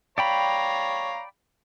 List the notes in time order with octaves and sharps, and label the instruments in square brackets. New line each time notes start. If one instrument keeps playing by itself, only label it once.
[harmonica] C#5 F5 A#5 [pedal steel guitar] D5 G5 B5